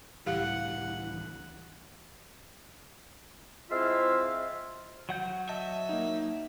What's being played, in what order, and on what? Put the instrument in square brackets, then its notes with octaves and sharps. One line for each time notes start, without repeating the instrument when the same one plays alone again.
[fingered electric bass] C#2 A2 G3 [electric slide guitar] E3 [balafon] G4 F5 [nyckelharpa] F#5
[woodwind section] G#3 C4 E4 F4 E5 F5
[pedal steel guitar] F#3 F#5 G6
[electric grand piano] D#5 A5 [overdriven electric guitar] E5
[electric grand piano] A#3 D#4